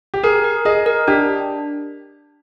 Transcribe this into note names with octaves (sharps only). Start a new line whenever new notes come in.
G4
G#4 A#4
A#4
G#4 D#5
A#4
D4 G4